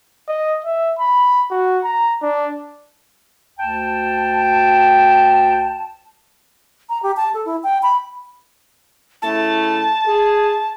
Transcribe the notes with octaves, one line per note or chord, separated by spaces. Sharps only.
D#5
E5
B5
F#4
A#5
D4
D2 G5 A5
A#5
G4
A5
A4
E4
G5
B5
C#3 A3 E4 A5
G#4